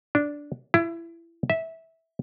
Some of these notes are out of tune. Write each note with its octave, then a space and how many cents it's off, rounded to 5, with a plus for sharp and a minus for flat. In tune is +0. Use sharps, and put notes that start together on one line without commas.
D4 -5
E4 +25
E5 -15